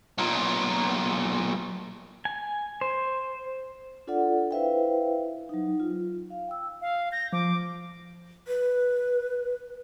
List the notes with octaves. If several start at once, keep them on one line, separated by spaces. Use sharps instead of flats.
B1 A#2
G#5
C5
D4 F4 A4 D5 F#5
E4 B4 C5 E5 F5 G5
F#3 D#4
F4
F5
G5 E6
F5
G6 A#6
F3 D6
B4